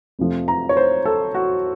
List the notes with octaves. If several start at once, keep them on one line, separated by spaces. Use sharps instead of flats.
F2 C3 F3 A3
A#5
C#5
C5
A4
F#4